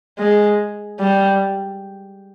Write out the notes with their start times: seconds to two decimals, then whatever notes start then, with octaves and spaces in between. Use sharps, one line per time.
0.19 G#3
1.00 G3